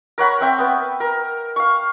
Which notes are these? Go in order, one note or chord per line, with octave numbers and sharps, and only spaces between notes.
A#4 C#5 F#5 B5
C4 E5 G5
B3 B4
A#4
F5 C#6